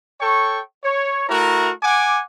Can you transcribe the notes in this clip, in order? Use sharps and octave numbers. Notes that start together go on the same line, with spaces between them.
A4 C#5 G5 C#6
C#5
A3 E4 F#4 A#4 A#5
F#5 G#5 D6